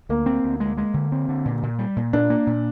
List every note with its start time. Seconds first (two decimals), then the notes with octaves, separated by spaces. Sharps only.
0.09 D2 A#3
0.26 C4
0.44 D2
0.60 G#3
0.77 G#3
0.94 D3
1.12 C4
1.29 D3
1.45 A#2
1.63 A#2
1.79 G3
1.97 A#2
2.13 A#2 D4
2.30 A#3
2.47 A#2